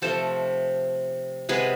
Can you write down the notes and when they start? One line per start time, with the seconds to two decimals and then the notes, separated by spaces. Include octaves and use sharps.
0.02 C3 F3 A3 A4 C5
1.49 C3 G#3 B3 G#4 B4